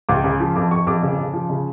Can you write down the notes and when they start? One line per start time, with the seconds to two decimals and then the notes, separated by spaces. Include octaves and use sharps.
0.09 C#2 D6
0.24 C#3
0.40 F3
0.56 F2 D6
0.71 F2 C#6
0.87 F2 D6
1.03 C#3 D6
1.18 C#3
1.33 F3
1.50 C#3